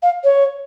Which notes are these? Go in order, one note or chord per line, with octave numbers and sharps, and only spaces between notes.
F5
C#5